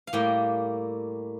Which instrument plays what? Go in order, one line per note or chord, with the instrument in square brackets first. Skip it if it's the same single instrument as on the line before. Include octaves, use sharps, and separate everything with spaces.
[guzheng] F5
A2 G3 A#3 G5